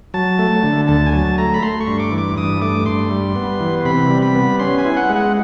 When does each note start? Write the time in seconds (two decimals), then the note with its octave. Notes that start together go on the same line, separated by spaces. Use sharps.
0.14 F#3 A5
0.39 A3
0.63 D3
0.88 D2 A5
1.06 G#5
1.13 F#3 A5
1.38 A3 A#5
1.54 B5
1.63 A3 C6
1.81 C#6
1.87 G2
2.00 D6
2.12 E3
2.18 D6
2.37 G2 D#6
2.62 A3 D6
2.86 G2 C6
3.11 G3
3.35 B3
3.60 E3
3.85 C3 B5
4.10 G3
4.22 B5
4.35 B3
4.59 C#4 C6
4.79 G#5
4.85 E4
4.97 F#5
5.10 G#3
5.16 F#5